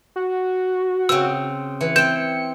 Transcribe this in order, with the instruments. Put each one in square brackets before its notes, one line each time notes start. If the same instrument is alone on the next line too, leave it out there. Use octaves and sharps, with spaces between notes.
[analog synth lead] F#4
[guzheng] C#3 C4 [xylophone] E6
[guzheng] E3 [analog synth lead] C#7
[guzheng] C4 G5 [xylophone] G6 E7